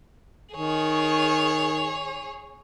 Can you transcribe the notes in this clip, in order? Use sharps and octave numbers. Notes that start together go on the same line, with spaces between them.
D#3 G#4 C#5